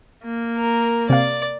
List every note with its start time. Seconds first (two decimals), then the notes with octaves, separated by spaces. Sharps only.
0.24 A#3
0.57 A#4
1.10 C3 D5 F5